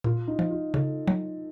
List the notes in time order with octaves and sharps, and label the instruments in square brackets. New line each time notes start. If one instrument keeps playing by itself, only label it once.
[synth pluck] A#2 [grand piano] F4
[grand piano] D#4
[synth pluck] F3
[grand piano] F4
[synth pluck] C#3 [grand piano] A4
[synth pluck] F#3